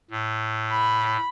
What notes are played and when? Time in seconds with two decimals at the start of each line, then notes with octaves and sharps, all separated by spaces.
0.10 A2
0.71 B5